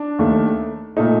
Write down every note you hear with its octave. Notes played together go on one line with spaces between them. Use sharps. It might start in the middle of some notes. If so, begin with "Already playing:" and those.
Already playing: D4
D#2 D#3 A3
A#2 A3 D#4